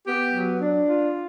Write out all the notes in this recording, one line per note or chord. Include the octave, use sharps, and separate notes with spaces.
B3 G4
F#3
D4
F4